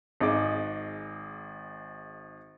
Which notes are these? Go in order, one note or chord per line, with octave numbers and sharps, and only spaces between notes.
G#1 D#4 G#4 D6